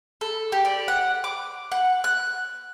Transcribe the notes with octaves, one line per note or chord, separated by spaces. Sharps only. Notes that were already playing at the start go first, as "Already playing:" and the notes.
A4
G4
D5
F#5
D6
F#5
F#6